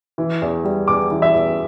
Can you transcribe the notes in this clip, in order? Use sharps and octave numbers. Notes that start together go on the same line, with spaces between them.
E3
E2
G3
E2 D6
E3
E5
E2